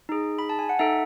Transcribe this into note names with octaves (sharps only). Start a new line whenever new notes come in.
D#4 G#4
B5
A5
G#5
F#5
D#4 A4 E5